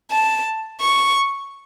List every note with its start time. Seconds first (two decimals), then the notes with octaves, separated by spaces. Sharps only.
0.11 A5
0.81 C#6